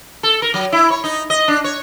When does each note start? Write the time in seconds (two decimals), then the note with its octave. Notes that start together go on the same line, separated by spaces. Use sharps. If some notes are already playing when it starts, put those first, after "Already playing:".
0.23 A4
0.42 A#4
0.54 F#3
0.72 E4
0.90 C#5
1.04 D#4
1.30 D#5
1.48 D4
1.64 C#5